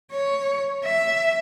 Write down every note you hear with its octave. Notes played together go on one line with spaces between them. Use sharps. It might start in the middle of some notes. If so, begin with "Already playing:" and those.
C#5
E5